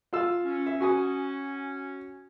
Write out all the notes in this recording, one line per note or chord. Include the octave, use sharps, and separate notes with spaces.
F4 F5 E6
C#4
E5
F#4 G#5 D#6